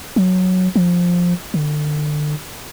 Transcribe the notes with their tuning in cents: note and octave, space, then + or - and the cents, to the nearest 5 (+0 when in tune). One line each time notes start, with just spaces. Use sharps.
F#3 -5
F3 +10
D3 +30